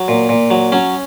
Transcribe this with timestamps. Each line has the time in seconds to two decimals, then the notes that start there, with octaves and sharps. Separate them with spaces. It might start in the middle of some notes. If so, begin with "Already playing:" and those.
Already playing: F#3
0.08 A#2
0.29 A#2
0.50 F#3
0.72 F#3 C#4